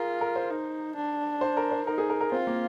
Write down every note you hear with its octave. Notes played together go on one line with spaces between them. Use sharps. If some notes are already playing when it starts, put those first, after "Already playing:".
Already playing: F4 G#4 A#4
A#4
C5
D#4
D4
C5
A#4
C5
D#4 A#4
G#4
A#4
A#4
C4 F4
A#3